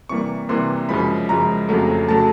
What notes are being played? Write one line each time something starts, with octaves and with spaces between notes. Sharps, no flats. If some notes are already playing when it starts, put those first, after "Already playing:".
C3 E3 G3 A#3 C#6
C3 E3 G3 A#3 C6
F#2 C#3 F3 G#3 B5
F#2 C#3 F3 G#3 A#5
F2 C#3 F#3 A3
C#3 F#3 A3 A5